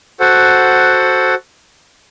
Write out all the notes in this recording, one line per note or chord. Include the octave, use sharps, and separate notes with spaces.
F#4 A4 C5 F#5